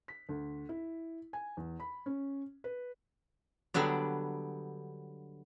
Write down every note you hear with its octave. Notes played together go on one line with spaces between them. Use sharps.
B6
D2
E4
G#5
E2
B5
C#4
B4
D3 F#3 G3 B3 D4